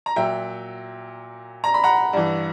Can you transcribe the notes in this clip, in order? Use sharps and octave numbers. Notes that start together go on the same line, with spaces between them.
A#5
A#2 F#3 E5 G5
A#5
B5
F#5 A#5
G2 E3